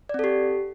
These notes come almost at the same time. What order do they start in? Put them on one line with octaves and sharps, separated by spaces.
D5 C4 A4 G4